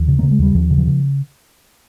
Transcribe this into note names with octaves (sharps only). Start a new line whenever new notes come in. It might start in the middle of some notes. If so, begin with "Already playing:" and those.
Already playing: D#2 F3
C#3
C#3 A#3
G#3
D#2 G3
D#2 F3
C#3
F3
C#3